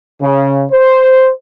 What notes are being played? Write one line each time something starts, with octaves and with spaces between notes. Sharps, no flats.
C#3
C5